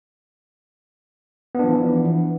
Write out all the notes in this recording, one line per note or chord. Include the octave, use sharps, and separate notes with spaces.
E3 F3 B3 D4